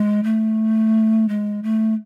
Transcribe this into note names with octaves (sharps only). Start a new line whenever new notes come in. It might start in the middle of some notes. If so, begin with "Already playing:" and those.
Already playing: G#3
A3
G#3
A3